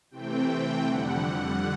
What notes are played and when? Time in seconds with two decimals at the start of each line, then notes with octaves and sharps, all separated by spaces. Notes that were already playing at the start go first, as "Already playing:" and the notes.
0.11 C3 E3 A3 C4 G5
0.49 G5
0.85 F2 D3 G3 F#5